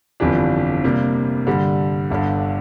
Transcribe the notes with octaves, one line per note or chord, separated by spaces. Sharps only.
G1 F2 E3 G3 D4
C3 G3 A#3
G2 D3 G3
G1 G2 D3